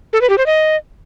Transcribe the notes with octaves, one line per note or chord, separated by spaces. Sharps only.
A4
B4
G4
C5
D#5